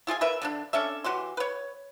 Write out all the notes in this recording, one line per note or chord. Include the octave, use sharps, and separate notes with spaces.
E4 F4 G#4 G#5
A#4 B4 E5
D3 A#3 D4
C#4 D4 A4 E5
E3 F#4 G4 C6
B4 C#5